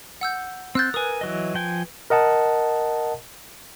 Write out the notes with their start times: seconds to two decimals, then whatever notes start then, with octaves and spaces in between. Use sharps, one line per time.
0.21 F#5 E6 G6
0.75 C4 E6 F#6 G6 A6
0.94 A#4 B4 G#5 D#6
1.21 E3 F#3 D#5
1.54 F3 G5 G#5
2.10 A#4 D#5 F#5 A5